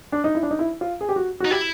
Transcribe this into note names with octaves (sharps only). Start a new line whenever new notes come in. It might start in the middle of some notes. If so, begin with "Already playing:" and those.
D4
D#4
E4
D4
D#4
E4
F4
G#4
G4
F#4
D#4 F#4
E4 G4